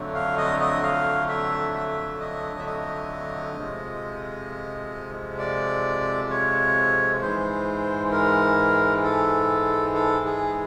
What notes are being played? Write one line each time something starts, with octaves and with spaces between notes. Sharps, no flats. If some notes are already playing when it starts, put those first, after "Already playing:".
Already playing: F2 D3 F#3 A3
F5
D#5
D#5
F5
E5
E5
D#5
E5
D#5
F2 C3 F3 G#3
D5
C#5
G#2 E3 G#3 C5
A#4
A4
A4
G#4